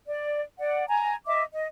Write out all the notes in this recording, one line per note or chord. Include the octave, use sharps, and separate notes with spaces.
D5
D5 F#5
G#5 A#5
D#5 E5 D6
D#5